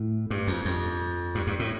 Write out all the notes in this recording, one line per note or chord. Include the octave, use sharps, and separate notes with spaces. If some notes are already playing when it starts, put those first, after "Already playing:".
Already playing: A2
G2
F2
F2
G2
G2
A2